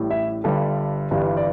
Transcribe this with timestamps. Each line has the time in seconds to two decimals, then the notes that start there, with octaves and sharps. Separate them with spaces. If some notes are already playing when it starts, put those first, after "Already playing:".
Already playing: A1 A2 G3
0.10 E4 E5
0.44 G1 G2 D3 G3 A4
1.11 G1 G2 E3 G3
1.37 D5